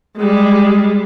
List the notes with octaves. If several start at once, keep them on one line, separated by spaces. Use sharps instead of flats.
G3 G#3